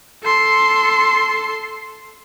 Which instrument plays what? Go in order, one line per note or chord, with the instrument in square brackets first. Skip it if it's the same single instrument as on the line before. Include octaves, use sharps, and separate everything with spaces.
[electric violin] A4 C6